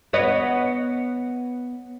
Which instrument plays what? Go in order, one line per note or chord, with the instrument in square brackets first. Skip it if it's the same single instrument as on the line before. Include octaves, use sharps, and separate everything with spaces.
[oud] B3 C#5 D#5